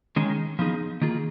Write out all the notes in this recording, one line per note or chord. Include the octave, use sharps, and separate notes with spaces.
D#3 G#3 C#4
F3 B3 D#4 G#4
D#3 A#3 F4 G#4